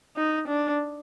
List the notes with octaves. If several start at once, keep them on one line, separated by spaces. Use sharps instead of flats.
D#4
D4